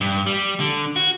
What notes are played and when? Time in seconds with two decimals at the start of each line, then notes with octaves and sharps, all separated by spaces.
0.01 G2
0.26 G3
0.60 D3
0.96 F#4